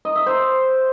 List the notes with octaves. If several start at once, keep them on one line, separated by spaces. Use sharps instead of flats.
D#5
E5
C5